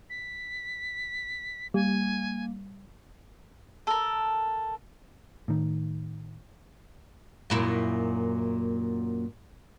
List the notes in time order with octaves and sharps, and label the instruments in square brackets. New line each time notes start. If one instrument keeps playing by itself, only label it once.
[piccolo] B6
[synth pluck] G3 [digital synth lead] A#3 [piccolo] G#5
[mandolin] A4 A#4
[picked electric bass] A2 D#3
[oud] F#2 A#2 E4